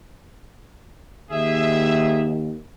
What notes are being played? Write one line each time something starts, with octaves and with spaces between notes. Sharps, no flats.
D#2 G#4 E5